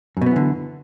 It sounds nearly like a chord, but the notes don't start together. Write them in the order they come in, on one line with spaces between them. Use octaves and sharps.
F#2 B2 B3 E3 D3